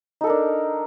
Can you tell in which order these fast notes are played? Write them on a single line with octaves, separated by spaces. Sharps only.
D#4 A4 A#4 D4